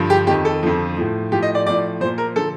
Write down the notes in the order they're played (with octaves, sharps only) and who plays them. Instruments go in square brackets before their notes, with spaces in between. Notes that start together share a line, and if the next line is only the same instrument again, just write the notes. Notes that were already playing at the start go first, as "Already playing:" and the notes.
Already playing: [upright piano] G2 D3 F3
G4
F2 D#3 G4
A4
F2 D3 F3
A2 F3
A2 F3 G4
D#5
D5
A2 F3 D5
A#2 F3 C5
A#4
D3 F3 A4